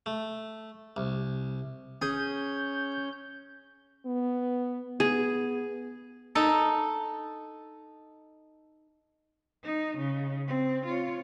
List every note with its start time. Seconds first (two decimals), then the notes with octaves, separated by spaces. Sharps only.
0.06 A3
0.97 C2
2.02 C#4 G#4 G6
4.06 B3
5.00 B3 G#4
6.35 D#4 A4
9.64 D#4
9.98 C#3
10.48 C4
10.86 F4 C#5